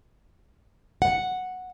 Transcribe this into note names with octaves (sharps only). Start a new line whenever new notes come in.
F#5